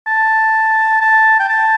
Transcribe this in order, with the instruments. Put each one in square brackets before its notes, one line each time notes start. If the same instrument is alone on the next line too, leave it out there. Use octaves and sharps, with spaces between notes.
[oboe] A5
A5
G5
A5